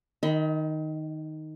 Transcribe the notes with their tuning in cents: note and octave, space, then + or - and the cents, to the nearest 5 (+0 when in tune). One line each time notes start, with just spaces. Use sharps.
D#3 +0 D#5 +40 B5 +20